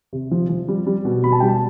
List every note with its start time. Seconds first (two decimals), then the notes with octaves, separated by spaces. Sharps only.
0.13 C3
0.31 F3
0.49 F3
0.68 G3
0.87 G3
1.05 B2
1.23 B2 B5
1.32 A5
1.40 G3 G5
1.48 A5